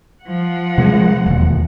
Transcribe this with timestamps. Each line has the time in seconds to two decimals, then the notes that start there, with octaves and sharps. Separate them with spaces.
0.24 F3 F#5
0.78 C3 G3 G#3
1.26 E1 D#2